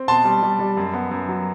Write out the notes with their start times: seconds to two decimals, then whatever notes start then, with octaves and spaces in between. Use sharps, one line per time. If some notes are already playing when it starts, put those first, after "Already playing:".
Already playing: C4
0.08 B2 A5 C6
0.25 G3
0.43 G3
0.59 G3
0.77 F#2
0.93 B3
1.11 F#2
1.28 F#3